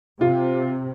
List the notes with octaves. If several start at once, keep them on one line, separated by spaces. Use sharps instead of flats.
C3 F4